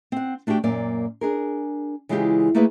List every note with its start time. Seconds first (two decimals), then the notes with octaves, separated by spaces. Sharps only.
0.12 C4 F#5
0.47 A3 D4 F#4 G4 G5
0.64 F#2 A#2 A#3 D5
1.21 D4 G#4 A#4
2.09 C#3 E3 G#3 B3 F4 G4
2.55 A3 A#3 D#4 E4 G#4 B4